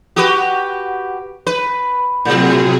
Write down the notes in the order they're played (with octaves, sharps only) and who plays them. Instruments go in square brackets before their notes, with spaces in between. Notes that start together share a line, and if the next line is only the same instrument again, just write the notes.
[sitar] F#4 G4 B4
B4
[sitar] A2 C4 [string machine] C3 F#3 G#4